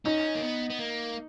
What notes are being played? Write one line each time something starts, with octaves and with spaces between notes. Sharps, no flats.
C#4 D#4
A#3
B3
B3
A#3